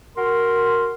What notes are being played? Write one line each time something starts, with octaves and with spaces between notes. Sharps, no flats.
F#4 A#4 C6